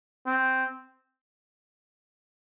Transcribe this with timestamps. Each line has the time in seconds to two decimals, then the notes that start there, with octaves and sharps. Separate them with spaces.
0.26 C4